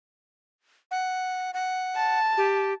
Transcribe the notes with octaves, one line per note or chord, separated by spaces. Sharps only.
F#5
F#5
A5
G4